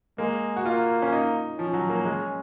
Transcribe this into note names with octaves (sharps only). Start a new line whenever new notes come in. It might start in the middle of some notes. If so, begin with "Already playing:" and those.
G#3 A#3
F#4
A#3 F4
C#4
D#4
F3 C#4
F#3
A#3
G#3